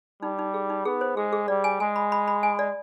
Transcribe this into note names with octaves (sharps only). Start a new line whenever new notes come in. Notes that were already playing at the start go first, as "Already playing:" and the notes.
G3 D#4
D#4
G#4
D#4
B3 G#4
C5
G#3 G#4
G#4
G3 D5
G#5
G#3 G#5
B5
B5
B5
G#5
D5